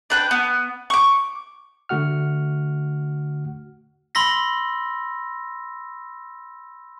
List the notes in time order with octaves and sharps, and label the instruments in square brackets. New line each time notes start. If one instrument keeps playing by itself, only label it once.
[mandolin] D4 B4 G5
B3
C#6 D6
[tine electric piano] D3 A3 F#4 F#5 F6
[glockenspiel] B5 C6 E6 A#6 B6